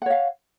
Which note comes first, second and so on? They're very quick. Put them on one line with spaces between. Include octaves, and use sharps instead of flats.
F#5 C#5 F5